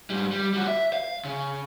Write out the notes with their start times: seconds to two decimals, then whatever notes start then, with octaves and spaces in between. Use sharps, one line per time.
0.10 G#2 G3
0.31 G3
0.54 G3 F#4
0.67 E5
0.93 F5
1.25 C#3